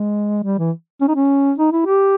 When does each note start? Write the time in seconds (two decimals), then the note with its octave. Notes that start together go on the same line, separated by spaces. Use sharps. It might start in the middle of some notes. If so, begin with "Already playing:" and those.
Already playing: G#3
0.43 G3
0.58 E3
1.01 C#4
1.08 D#4
1.15 C#4
1.58 D#4
1.72 E4
1.86 G4